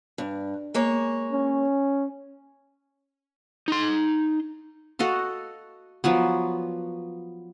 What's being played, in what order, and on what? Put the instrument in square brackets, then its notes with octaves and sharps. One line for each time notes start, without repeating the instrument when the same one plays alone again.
[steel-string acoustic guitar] G2
G#3 A#3 C#5
[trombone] C#4
[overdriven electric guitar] D#4 C6
[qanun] F#4 A4 D#5 F5
F3 F#3 B3